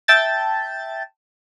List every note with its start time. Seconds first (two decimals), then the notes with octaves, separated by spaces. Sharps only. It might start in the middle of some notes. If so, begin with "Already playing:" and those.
0.08 E5 G5 A5 G6 A6